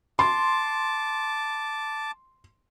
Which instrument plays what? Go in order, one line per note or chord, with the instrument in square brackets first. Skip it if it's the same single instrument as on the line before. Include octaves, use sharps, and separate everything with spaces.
[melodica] A5 D6 [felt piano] C6